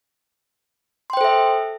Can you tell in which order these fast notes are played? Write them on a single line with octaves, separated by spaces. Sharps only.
C6 G5 C5 A4 E5